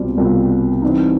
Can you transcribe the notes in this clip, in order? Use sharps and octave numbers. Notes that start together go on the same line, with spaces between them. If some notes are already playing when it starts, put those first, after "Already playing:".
Already playing: C2 B2 G3 C4 F4
C2 B2 G3 C4 F4
E3 G3 C4 D#4